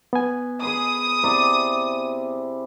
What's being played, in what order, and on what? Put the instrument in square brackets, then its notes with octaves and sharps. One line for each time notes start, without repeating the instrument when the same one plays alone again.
[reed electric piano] B3 G#5
[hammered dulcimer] G#4 B5 C6 [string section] D#6
[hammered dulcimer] C3 E4 D5